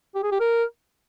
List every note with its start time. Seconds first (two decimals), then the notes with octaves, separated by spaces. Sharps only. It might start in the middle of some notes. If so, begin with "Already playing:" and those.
0.15 G4
0.23 G#4
0.32 G4
0.40 A#4